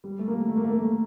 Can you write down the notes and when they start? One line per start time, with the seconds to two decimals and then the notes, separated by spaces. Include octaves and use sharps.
0.04 G3
0.19 A3
0.28 A#3
0.34 A3
0.49 A3
0.57 A#3
0.64 A3
0.70 A#3
0.78 A3